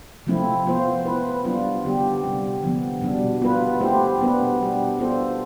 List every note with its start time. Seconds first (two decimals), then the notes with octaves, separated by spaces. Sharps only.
0.26 C3 F3 A3 C4 E4
0.66 F3 B3 F4 C5
1.06 B3 E4 B4
1.45 G3 B3 D4 F4
1.84 D3 G3 B3 D4 G4
2.23 C3 G3 C4
2.63 D3 F3 B3
3.01 B2 G3 D4
3.42 B3 F4 B4
3.80 A3 E4 G4 C5
4.20 B2 B3 D4 G4 B4
4.59 B2 G3 D4 G4
4.99 B3 D4 F4 A4 C5